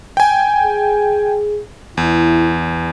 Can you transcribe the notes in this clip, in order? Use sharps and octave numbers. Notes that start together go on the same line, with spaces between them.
G5 G#5
G#4
E2 E4